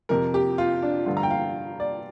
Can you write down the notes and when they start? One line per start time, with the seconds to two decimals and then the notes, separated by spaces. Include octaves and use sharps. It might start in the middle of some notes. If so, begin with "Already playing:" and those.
0.09 F2 C3 F3 A#4
0.34 G4
0.58 F4
0.82 D4
1.06 G2 D3 F3 F4
1.17 A#5
1.23 G5
1.30 F5
1.80 D5